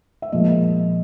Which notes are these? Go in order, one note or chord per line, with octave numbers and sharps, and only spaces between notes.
E5
A#2 F3 G#3 D#5